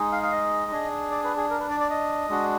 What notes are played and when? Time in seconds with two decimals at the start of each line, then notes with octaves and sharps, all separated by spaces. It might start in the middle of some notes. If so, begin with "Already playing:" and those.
Already playing: G#3 D#4 G#4
0.12 F5
0.23 F5
0.32 D#5
0.72 D4 G#4
1.11 D5
1.24 B4
1.37 G#4
1.50 A#4
1.60 B4
1.70 D5
1.80 D5
1.90 D#5
2.29 G#3 D4 F#4